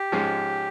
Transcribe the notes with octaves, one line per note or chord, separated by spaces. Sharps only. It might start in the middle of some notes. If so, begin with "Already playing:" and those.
Already playing: G4
G#2 F3 G#3 C#4